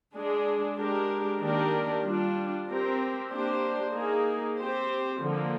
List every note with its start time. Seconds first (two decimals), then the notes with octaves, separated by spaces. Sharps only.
0.14 G#3 D4 G#4
0.77 G#3 D4 G4 A#4
1.42 D#3 A#3 D4 G4 A#4
2.05 G3 D4 F4
2.68 C4 G4 A#4
3.31 A#3 D4 G4 C5
3.94 A#3 D#4 G#4
4.57 C4 G4 C5
5.21 D3 F3 A#3